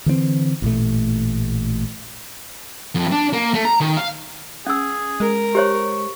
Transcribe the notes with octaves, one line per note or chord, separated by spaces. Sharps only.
D3 E3 A#3 C4
A1 A#2 A3
F2
D4
A#3
A3
A#5
D#3
F5
C#4 G#4 E6
G#3 A#4
G4 C5 C#5 C#6